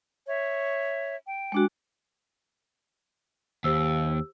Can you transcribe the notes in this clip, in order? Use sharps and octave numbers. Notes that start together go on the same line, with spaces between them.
C#5 E5
G5
G#3 D4 F#4
D#2 G4 C5 E6